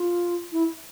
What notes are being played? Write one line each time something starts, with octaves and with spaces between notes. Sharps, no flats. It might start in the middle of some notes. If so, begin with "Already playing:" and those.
Already playing: F4
E4